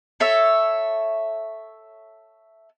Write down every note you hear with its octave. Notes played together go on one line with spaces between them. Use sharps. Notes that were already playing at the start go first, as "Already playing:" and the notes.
A4 C#5 E5